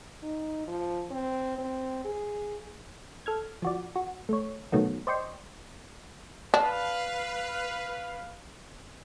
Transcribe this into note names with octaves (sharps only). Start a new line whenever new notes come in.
D#4
F3
C4
C4
G#4
A4 F6 G#6
F3 F#4 D5
F#4
A3 C#5
B2 D#3 F#3 A3 B3
C5 D5 D#5 G5 C6 C#6
D4 B4 F5